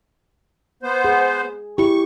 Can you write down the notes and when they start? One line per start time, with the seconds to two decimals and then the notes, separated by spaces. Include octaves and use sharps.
0.83 B3 C5
1.05 G#4
1.78 E4 G4 C#6